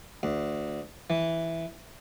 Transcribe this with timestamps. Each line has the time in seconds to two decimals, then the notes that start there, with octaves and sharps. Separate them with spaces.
0.23 D2
1.10 E3